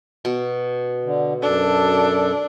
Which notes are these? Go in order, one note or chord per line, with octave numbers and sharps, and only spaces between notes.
B2
D3
F#2 D4 A4